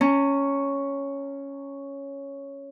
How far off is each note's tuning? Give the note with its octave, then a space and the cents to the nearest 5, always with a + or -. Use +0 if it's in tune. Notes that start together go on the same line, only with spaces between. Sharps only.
C#4 +0 A#5 -40